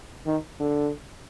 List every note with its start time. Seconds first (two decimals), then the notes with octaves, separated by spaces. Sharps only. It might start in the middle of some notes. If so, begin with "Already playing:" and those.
0.26 D#3
0.60 D3